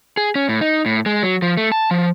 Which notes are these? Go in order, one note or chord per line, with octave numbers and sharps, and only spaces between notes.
G#4
C#4
A2
D#4
A2
G#3
F#3
F3
A3
A5
F3